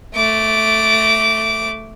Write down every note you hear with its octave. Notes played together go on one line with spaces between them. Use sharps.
A3 D6